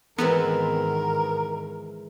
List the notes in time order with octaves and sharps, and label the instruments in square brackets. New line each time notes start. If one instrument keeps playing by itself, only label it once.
[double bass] G#2 D#3 [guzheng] E3 G#3 C4 [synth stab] B3 [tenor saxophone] A#4